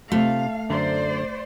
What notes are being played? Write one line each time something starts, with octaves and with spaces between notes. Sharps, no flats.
C3 A3 F4 F5
F#2 D3 C5 D5 A#5